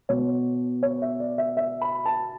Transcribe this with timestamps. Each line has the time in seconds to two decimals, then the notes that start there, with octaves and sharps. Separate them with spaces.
0.09 B2 C#5
0.83 C#5
1.02 E5
1.20 D5
1.38 E5
1.57 E5
1.81 B5
2.05 A5